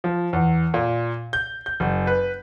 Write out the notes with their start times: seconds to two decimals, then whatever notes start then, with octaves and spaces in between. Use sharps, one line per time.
0.04 F3
0.33 E2
0.74 A#2
1.33 G6
1.66 G6
1.80 F#1
2.07 B4